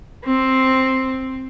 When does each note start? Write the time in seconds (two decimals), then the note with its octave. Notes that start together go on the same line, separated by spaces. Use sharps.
0.25 C4